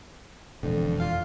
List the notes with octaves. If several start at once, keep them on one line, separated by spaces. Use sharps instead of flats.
E1 F2 D3
F4 F5